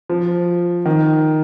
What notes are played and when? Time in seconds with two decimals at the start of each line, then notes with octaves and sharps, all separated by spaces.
0.09 F3
0.86 D#3